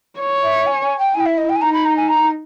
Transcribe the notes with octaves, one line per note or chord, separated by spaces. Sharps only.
C#5
E5
G#5
G#5
G5
E4 G#5
G5
E5
D#5
G5
G#5
D#4 A#5
B5
A#5
G#5
A#5